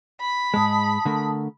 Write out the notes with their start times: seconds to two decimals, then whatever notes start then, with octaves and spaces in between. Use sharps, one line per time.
0.19 B5
0.54 G#2 G#3 A5 D#6
1.05 D3 A3 A#4